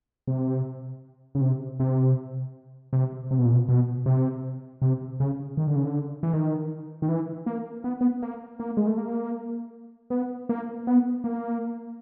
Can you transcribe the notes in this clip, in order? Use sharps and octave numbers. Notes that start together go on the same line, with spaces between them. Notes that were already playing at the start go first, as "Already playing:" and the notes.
C3
C#3
C3
C3
C3
C3
B2
A#2
B2
B2
C3
C3
C#3
D#3
D3
C#3
D3
E3
D#3
D#3
E3
A#3
B3
B3
A#3
A#3
G#3
A3
A#3
B3
A#3
B3
A#3